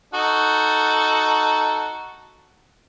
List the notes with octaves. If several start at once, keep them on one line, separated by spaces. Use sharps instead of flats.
D#4 F#4 A4